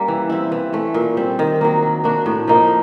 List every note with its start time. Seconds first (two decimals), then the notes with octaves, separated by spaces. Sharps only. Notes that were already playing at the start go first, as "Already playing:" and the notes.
Already playing: G3 A#3 C#4
0.08 E3
0.29 G3 C4 E4
0.52 E3
0.73 A3 C#4
0.94 A#2
1.17 G3 C4
1.39 D#3
1.61 F#3 A#3
1.82 F#3
2.04 A#3 D4 F#4
2.26 A2
2.48 F3 A#3 D#4